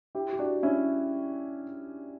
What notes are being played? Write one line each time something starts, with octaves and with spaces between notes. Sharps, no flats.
E4 G4
G4
D4 F#4
C#4 E4